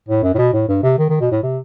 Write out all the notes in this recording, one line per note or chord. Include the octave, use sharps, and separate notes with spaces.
A2
F#2
A2
B2
A2
G2
C3
D#3
D#3
B2
A2
C3